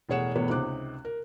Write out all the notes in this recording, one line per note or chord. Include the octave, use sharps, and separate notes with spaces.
E1 A2 G#4 C#5 F#5 E7
E1 E2 A2 B3 C#5
C#2 C3 D#4 C5 D6 F#6
A#4